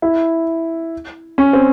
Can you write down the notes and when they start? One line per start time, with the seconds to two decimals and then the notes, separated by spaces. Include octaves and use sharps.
0.02 E4
1.38 C#4
1.53 C4